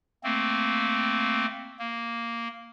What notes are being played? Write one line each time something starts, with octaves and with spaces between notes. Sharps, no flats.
A3 A#3 C4
A#3